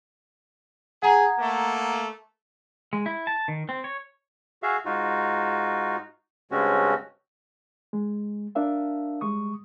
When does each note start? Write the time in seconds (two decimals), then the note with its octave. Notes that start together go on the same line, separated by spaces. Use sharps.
1.03 G#4 F#5 A#5 G#6
1.38 A3 A#3
2.93 G#3
3.06 E4
3.27 A5
3.48 D#3
3.69 C4
3.84 C#5
4.63 F#4 G#4 E5 F5
4.86 G#2 D#4 F4 F#4
6.51 G2 C#3 G#3 C4 C#4 F#4
7.93 G#3
8.55 D4 A#4 E5 F5
9.21 G3 G#3 C#6 D#6